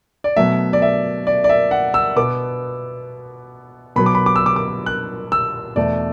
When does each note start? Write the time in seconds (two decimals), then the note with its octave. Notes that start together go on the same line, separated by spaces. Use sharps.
0.24 D5
0.37 B2 F#3 A3 E5
0.73 D5
0.82 E5
1.27 D5
1.44 D5
1.49 E5
1.71 F#5
1.94 E6
2.16 B2 B3 D6
3.96 B2 F#3 B3 B5
4.06 D6
4.15 B5
4.26 D6
4.36 E6
4.46 D6
4.56 D6
4.86 F#6
5.32 E6
5.76 E2 B2 A3 D5